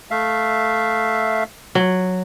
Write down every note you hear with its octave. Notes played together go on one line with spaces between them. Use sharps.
A3 E5 F5
F#3